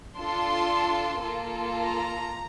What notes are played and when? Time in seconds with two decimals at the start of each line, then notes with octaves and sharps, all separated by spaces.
0.18 D4 F4 A4 C6
1.23 A#3 F4 A4
1.75 A#5